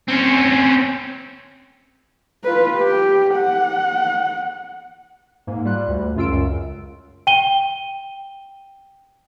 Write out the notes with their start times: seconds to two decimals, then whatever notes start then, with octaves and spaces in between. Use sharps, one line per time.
0.08 C4 C#4
2.44 F4 B4
2.77 G4
3.35 F#5
5.47 G#2 A#3
5.65 G3 F4 F#6
5.88 D2
6.16 F#2 C#3 F4 E6 D7
6.28 C#2 F#2
7.27 G5 D#7 G7